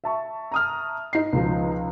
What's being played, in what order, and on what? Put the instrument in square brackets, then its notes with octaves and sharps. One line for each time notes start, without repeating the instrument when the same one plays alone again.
[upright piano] E5 A5 C#6
[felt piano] A#5 D#6 F6
D#4 C7
[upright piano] C#2 F3